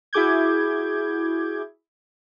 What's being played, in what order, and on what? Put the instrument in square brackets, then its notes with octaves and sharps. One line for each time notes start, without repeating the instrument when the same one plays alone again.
[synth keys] E4 F#4 G#4 D6 G6 G#6